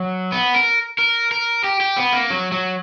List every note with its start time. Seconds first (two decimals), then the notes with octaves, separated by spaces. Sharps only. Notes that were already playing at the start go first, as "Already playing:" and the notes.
Already playing: F#3
0.32 B3
0.55 A#4
0.99 A#4
1.31 A#4
1.64 G4
1.81 G4
1.97 B3
2.13 A#3
2.30 F#3
2.52 F#3